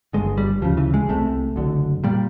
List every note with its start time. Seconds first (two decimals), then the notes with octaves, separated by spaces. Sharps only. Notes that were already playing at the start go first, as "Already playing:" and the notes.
0.13 G1 G2 D3 G#3
0.38 G3
0.61 D2 C#3 F3
0.77 E3
0.94 G#3
1.09 C2 C3 A3
1.56 F#1 F#2 D3
2.04 A#2 G3